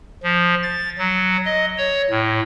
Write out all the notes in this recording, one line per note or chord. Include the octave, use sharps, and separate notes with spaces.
F3
A6
F#3
D#5
C#5
A2